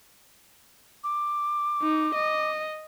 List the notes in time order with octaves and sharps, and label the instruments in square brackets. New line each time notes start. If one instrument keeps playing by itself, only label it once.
[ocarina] D6
[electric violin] D#4
D#5